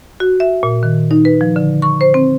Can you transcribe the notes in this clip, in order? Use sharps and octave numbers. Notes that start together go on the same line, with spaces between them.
F#4
E5
A#2
D#3
D#4
B4
F3
D3
C#6
C5
C4